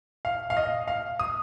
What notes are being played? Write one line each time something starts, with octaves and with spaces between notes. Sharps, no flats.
F5
F5
D#5
F5
D#6